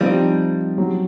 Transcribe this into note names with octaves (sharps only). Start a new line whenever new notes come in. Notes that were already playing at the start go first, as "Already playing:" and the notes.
F3 G3 C4 D#4
F#3